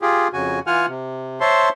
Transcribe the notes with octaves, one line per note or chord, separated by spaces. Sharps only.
F4 G4 G#4
F2 C#3 F#4 G#5
E3 F4 F#5 G#5 F6
C3
C5 C#5 E5 A5 C6